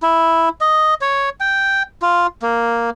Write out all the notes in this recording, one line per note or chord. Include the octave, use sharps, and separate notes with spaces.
E4
D#5
C#5
G5
F4
A#3